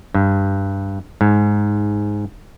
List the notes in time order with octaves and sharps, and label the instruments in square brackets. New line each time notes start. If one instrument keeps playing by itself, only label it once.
[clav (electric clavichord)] G2
G#2